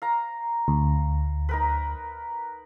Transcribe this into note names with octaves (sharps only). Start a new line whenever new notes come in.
F5 A#5
D2
D#4 A#4 B4